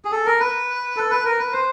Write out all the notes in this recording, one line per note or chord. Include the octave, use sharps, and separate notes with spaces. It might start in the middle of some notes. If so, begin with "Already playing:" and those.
G#4
A4
A#4
B4
A4
B4
A#4
B4
C5